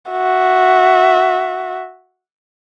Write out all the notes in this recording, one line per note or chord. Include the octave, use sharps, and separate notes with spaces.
F#4 E5